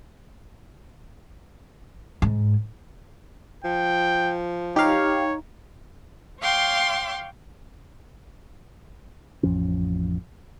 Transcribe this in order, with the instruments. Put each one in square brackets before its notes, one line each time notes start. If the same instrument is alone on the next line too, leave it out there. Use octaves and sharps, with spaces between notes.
[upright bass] G#2
[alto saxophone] F3 [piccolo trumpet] G5
[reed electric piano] D#4 A#5 [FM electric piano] G4 F5 [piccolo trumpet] C#5
[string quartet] C#5 F5 G5 C6 D6
[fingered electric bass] A1 F2 F3 C#4